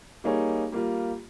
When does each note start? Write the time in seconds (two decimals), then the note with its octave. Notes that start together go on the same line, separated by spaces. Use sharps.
0.24 G3 A#3 D#4 G#4 C#5
0.72 G3 A#3 F4